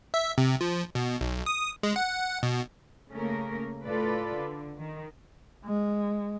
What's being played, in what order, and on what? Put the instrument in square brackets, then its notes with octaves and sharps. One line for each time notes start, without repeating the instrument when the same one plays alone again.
[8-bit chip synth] E5
C3
F3
B2
B1
D#6
G#3
F#5
B2
[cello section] C#3 A3 A#3 C#4 A#4
A2 F4 A4 B4 D5
D3
D#3
[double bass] G#3